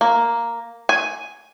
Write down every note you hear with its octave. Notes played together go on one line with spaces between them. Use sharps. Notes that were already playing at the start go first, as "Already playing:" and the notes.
A#3
G#5